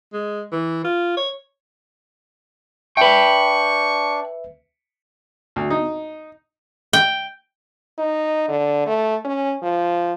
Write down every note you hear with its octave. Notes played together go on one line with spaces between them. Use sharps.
G#3
E3
F4
C#5
D4 B4 E5 G5 B5 C#6
D2
D#4
G5
D#4
D3
A3
C#4
F3